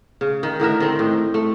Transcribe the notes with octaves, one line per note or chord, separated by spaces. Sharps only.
C#3
D#3
A2 D3 A#4 E5
D#3 C4
A2
A3